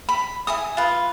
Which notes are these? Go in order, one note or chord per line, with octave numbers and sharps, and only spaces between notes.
B5
E4 G#5 D#6
F4 B4